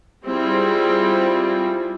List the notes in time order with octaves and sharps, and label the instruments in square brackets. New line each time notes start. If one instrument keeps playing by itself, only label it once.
[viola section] G3 C4 E4 F4 G#4